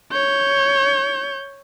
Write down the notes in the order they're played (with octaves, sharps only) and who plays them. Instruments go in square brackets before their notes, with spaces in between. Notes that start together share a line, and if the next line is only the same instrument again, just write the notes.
[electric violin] C#5 G6